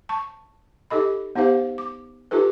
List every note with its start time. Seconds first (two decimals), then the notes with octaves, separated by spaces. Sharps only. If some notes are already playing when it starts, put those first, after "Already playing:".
0.09 A5 C#6
0.90 D#4 G4 A4 D#5 B5
1.35 B3 D#4 G4 C5 F5
1.78 D6
2.31 D#4 F4 G4 A4 B4